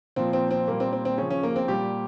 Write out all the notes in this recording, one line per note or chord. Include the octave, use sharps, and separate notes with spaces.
A#2 F3 C4
C4
C4
A#2 G3 A#3
C4
C4
C4
C#3 F3 C#4
C#4
A#3
C4
A#2 G3 G4